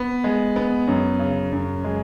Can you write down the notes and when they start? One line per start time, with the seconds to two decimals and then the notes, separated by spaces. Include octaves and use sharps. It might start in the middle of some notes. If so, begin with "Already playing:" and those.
Already playing: B3
0.24 G#3
0.56 B3
0.87 F#2
1.19 C#3
1.52 F#2
1.84 G#3